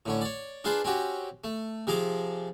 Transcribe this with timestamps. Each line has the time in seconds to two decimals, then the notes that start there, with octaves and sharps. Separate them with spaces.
0.06 A2 D3 C#4
0.21 C#5 D5
0.64 D4 F4 G#4 B4 C5
0.84 C4 C#4 F#4 G4
1.44 A3
1.87 C3 F3 G#4 A#5 D6